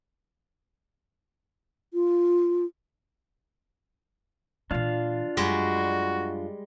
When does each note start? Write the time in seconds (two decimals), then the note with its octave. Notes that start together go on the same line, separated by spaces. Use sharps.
1.94 F4
4.71 A#2 E3 D4 F4 F5
5.37 F#2 G3 G#3 F#4